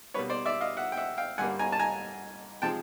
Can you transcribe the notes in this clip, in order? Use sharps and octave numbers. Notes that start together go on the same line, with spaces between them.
B2 G3 A#3 B4 C#5
C5 D5
D5 E5
D#5 F5
E5 F#5
G5
E5 F#5
F5 G5
G2 D3 G3 A#3 F#5 G#5
G#5 A#5
A5
G#5 A#5
C3 F3 G#3 G5 A5